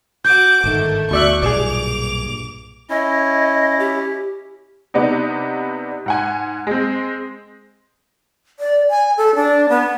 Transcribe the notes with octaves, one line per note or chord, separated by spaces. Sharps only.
F#4 D6 G6
G1 G#2 D#3 A3
D2 B2 D5 E5 C#6 F#6
B1 G2 A#2 G#4 D5 D6 F7
C#4 E4 D#5
G4
C3 B3 D4 D#4
G#2 F#5 G#5
G#3 C4
D5
G#5
A4
D4
B3